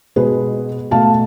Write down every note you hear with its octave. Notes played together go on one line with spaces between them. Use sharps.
B2 G#3 G#4 B4
B2 A3 F5 A5